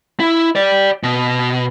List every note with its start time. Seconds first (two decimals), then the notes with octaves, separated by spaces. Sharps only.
0.20 E4
0.56 G4 D5
1.03 B2